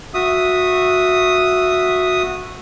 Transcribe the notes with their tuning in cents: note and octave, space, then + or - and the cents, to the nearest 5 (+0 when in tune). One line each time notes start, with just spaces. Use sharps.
F#4 -15 E5 +0 D#6 +0